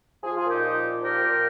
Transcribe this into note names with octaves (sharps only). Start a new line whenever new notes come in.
F3 F4 G#4
F4 G#4
A#2
D#4 G4
F3
A#2
F3 G4 A#4
A#2